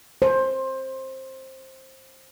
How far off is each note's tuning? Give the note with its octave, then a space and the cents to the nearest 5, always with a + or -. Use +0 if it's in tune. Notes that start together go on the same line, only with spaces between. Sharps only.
C5 +15